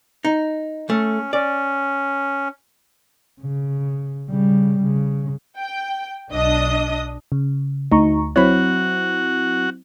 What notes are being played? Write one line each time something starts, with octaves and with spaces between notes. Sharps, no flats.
D#4
A3 C#4
C#4 D5
C#3
C#3 G3
C#3
G5
B1 D4 D#5 D#6
C#3
D2 D#4 A#5 C#6
F#3 C4 E4 F#4 C#5 B5